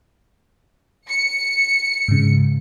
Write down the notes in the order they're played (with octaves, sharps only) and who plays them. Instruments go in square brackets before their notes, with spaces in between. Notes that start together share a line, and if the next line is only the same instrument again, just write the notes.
[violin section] C#7
[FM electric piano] G#2 C#3